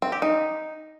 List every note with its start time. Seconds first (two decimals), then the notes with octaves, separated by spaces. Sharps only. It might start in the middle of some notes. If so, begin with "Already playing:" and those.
0.02 C4
0.12 G4
0.22 D#4